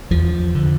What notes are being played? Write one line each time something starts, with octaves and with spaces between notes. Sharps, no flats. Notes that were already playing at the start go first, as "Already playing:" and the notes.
E2 F3
D3